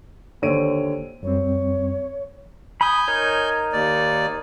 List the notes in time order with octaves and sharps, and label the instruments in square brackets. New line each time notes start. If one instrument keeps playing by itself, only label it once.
[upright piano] D#2 D3 C5 C#5 D7 D#7
[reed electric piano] F#2 G3 C4 [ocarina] C#5
[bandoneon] G#5 G6 [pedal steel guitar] B5 D#6
[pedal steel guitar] D#4 A#4 C#5
[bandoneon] D#2 D5